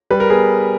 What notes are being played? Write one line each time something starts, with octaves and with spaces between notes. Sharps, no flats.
G3 B4
A#4
B3 G#4